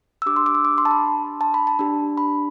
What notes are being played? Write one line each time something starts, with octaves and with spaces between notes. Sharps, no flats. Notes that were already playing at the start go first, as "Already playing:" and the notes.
E6
D4 G4 D6
C6
D6
E6
D6
C6
A5
B5
A5
B5
A5
D4 G4
B5